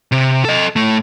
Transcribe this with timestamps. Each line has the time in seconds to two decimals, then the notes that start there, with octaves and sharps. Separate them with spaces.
0.12 C3
0.45 A4 D#5
0.76 A2 A3